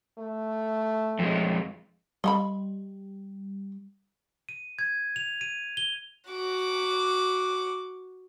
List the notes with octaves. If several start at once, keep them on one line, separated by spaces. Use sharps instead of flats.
A3
F2 G#3
G3 D#5 F#5 B5
D#7
G#6
F7
D#7
G7
F#4 D6